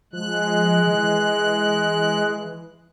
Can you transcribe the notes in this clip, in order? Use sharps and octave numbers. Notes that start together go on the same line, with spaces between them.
F3 G#3 F#6
E3